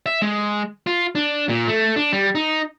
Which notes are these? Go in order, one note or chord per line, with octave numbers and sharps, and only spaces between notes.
E5
G#3
F4
D4
A#2
A3
D4
G3
D#4